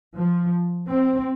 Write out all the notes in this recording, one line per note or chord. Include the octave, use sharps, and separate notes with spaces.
F3
C4